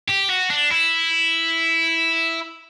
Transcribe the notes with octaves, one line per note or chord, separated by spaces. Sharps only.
G4
F#4
D4
E4